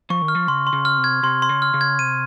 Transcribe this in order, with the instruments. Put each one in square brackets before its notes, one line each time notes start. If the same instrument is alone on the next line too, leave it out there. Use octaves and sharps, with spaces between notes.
[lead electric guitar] F3 [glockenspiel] C#6
[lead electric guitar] D#3
[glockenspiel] F6
[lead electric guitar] F3
[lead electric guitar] C#3 [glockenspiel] C6
[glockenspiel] C6
[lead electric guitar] C#3
[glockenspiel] F6
[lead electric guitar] C3
[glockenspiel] G#6
[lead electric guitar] C3 [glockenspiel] C6
[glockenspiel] C6
[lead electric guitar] C#3
[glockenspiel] F6
[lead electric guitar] C#3
[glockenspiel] G#6
[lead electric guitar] C3 [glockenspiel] D#7